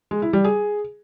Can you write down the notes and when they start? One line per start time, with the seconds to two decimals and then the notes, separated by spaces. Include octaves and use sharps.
0.11 G#3
0.22 E4
0.33 G3
0.44 G#4